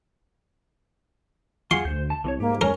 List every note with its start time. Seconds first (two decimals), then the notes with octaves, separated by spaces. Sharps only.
1.71 F4 G#4 F#5 C6
1.85 D2 C5 G6
2.10 A5
2.24 C2 E3 C#5
2.40 G#2 A#3 G4
2.61 C#4 A#4